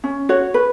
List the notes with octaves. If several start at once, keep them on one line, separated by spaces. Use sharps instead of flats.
C#4
F#4 C#5
B4